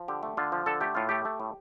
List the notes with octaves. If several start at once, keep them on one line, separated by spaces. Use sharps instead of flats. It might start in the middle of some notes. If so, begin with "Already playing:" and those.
Already playing: F3
D3 G4
A3
D3 F4
F3
D3 A4
A3 G4
A2 F4
A3 G4
A3
A2